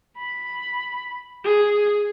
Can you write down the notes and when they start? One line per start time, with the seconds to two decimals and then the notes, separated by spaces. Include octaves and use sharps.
0.18 B5
1.44 G#4